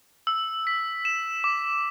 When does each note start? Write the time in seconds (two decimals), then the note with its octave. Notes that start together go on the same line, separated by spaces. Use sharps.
0.27 E6
0.67 B6
1.05 E7
1.44 D6